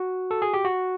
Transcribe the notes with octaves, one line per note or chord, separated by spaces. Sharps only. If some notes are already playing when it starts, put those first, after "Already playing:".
Already playing: F#4
A4
G#4
G4
F#4